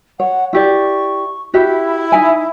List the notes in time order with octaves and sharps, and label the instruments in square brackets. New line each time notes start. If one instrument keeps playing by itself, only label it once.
[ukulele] C#5 [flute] F#5
[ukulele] E4 G4 D5 [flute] C#6
[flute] E4 [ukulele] F#4 G4 E5
[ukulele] D#4 E5 G#5